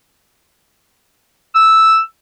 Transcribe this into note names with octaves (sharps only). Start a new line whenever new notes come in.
E6